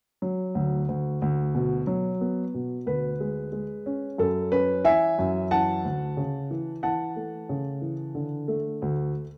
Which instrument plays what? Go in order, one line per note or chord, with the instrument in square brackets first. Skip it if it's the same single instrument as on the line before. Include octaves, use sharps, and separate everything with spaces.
[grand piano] F#3
D2
D2
D2
B2
F#3
B3
B2
D2 B4
G#3
G#3
C#4
F#2 A4
C#4 B4
E3 E5 G#5
F#2
E3 F#5 A5
D2
C#3
E3
E3 F#5 A5
A3
C#3
E3
D3
A3
D2